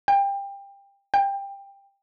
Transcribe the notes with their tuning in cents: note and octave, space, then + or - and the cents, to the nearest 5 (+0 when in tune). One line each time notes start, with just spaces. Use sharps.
G5 +25
G5 +20